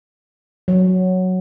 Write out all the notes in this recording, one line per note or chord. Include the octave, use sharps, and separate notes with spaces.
F#3